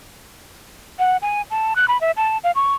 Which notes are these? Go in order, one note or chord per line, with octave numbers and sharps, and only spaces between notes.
F#5
G#5
A5
F#6
B5
E5
A5
F5
C#6